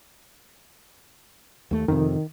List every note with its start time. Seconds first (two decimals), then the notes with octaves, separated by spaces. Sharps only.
1.71 D#2 A3
1.88 F2 C3 D#3